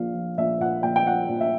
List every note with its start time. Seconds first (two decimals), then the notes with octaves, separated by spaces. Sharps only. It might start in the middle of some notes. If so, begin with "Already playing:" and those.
Already playing: A#1 A#2 F5
0.14 F3
0.38 A#1 E5
0.60 A#2 F#5
0.83 A#1 G5
0.96 G5
1.06 F3 F#5
1.29 A#1
1.41 E5